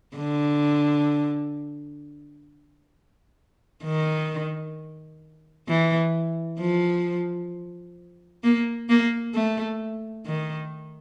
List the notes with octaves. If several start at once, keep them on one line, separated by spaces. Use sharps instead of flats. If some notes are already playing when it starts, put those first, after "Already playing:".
D3
D#3
E3
F3
A#3
A#3
A3
D#3